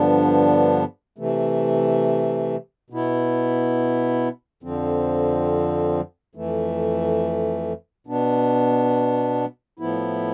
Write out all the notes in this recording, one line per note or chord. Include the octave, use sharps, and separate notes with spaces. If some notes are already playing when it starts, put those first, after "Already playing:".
Already playing: G2 D3 F3 B3 D4
C3 E3 A3
B2 B3 E4
F2 D3 F3 C4
F2 E3 A3
B2 B3 D4
A2 F3 B3 E4